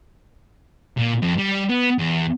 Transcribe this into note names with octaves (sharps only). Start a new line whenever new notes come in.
A#2
F2
G3
B3
E2